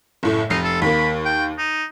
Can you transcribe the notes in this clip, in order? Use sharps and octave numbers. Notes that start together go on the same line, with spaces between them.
F#1 A2 A3
F1 D#4 C7
A4
D#2 A#3 B5
G5
D#4